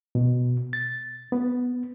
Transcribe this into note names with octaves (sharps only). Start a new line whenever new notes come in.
B2
A6
B3